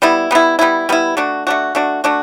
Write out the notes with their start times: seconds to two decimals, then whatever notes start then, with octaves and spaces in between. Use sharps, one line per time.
0.02 G3 B3 E4
0.31 G3 B3 E4
0.59 G3 B3 E4
0.89 G3 B3 E4
1.17 A3 D4 F#4
1.47 A3 D4 F#4
1.75 A3 D4 F#4
2.04 A3 D4 F#4